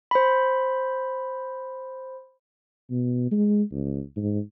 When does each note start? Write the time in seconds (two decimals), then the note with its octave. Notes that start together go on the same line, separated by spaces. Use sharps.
0.11 C5 B5
2.90 B2
3.32 G#3
3.72 C#2
4.17 G#2